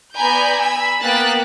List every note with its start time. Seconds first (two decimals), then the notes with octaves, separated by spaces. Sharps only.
0.14 B3 D5 G#5 A#5 B5 G6
0.62 G#5 B5 E6 B6
1.02 A#3 B3 G5 F#6 A6 B6